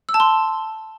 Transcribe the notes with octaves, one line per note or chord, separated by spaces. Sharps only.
E6
A5
C6